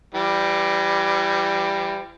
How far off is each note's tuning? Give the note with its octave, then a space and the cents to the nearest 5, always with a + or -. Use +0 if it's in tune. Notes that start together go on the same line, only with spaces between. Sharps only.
E3 +40 G3 +5